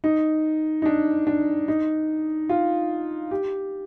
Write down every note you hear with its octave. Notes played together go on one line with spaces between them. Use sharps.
D#4
D#4
D4
D4
D#4
F4
G4